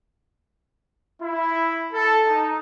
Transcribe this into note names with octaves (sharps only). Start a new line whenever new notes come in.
E4
A4
D#4